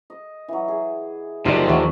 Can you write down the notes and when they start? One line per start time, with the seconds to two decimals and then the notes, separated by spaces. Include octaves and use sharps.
0.10 D#5
0.48 E3 F#3
0.68 G#4
1.45 F#1 C3 F3 D#4 G4 D5
1.69 D#2 E3 F#3 A3 F#4